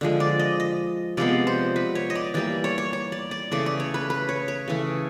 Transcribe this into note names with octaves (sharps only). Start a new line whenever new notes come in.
D3 F3 G#3
D5
D#5
D#5
C3 F3 G#3 B3 D5
C5
B4
C#5
D#5
D5
E3 G3 A#3 D5
C#5
C#5
C#5
D5
D5
C#3 E3 A3 D5
D5
C#5
B4
B4
C#5
C#5
C#3 E3 A3